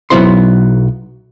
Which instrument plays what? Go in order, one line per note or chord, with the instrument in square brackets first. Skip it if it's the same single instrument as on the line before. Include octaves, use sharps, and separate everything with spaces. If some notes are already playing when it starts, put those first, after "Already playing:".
[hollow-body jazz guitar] B1 F#3 B3 E4 C5 C6